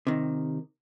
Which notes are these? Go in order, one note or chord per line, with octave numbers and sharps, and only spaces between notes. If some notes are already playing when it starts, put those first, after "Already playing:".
C3 D#3